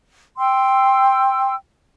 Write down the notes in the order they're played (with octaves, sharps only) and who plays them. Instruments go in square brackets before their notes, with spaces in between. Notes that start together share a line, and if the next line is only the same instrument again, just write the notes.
[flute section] G5 C6 E6